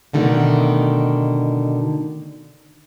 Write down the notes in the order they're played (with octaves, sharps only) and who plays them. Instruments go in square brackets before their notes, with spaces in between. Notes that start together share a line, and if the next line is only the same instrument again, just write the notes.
[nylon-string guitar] B2 D3 D#3 A3